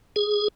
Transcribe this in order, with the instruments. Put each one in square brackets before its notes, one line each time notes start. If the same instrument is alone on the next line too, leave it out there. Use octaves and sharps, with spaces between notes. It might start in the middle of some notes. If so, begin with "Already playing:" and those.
[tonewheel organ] G#4